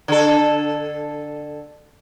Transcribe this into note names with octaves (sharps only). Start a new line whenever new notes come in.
D3 A4